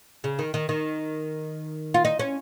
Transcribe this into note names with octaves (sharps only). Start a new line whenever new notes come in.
C#3
D#3
D#3
D#3
F4
D#4
C#4